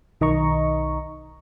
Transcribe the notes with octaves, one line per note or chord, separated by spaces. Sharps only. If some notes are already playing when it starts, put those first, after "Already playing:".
B1 D#3 D#5 A#5 C#6